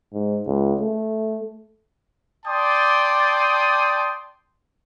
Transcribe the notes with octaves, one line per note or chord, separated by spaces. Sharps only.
G#2
C#2
A3
D5 G5 A5 C6 D6 D#6